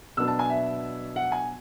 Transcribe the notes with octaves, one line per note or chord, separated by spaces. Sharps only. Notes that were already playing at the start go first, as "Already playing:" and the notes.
B2 F#3 B3 D4 E6
A5
G#5
E5
F#5
G#5